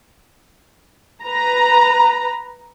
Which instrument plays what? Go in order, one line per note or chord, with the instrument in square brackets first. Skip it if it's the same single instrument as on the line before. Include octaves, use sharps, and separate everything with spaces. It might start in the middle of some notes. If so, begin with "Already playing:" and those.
[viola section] B4 A#5